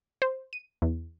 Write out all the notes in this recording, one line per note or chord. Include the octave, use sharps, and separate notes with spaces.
C5
D#7
E2